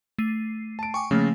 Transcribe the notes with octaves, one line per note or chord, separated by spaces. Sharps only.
A3 C7 D#7
A5 D7
G5 G#5 C#6 D6
C#3 F3 A3 A#3